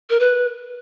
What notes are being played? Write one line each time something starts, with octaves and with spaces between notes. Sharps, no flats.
A#4
B4